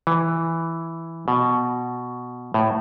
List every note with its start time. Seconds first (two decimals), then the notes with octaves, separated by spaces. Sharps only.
0.07 E3
1.28 B2
2.54 A2